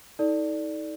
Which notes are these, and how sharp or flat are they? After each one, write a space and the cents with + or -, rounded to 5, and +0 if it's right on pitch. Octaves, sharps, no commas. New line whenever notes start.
D#4 +35 A4 +0 D5 +0